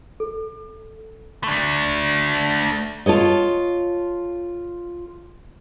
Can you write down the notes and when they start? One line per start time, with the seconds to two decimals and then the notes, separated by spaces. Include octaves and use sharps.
0.20 A4
1.44 A3 D4
3.06 F4 A4 C#5 D#5